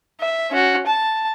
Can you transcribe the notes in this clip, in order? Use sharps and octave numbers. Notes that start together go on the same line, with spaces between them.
E5
C#4 F#4
A5